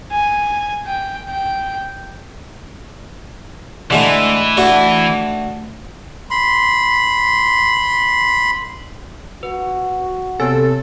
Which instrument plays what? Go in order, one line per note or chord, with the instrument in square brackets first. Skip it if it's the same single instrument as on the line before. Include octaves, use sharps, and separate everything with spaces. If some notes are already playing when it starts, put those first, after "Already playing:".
[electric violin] G#5
G5
G5
[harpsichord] D3 G#3 A3 [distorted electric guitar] E3
[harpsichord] A3 D4 F#4
[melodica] B5 C6
[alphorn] F#4 [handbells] B4
[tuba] C3 [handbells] B3 C#5 G#5 [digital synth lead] A4